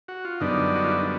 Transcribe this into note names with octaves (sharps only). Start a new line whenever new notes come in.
F#4
F4
F#2 D3 G3 B3 D4 D#4
F#4
F4
E4
D#4